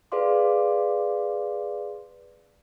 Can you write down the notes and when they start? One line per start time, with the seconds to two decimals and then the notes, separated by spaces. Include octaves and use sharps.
0.12 G#4 B4 D5 F5 C6 D6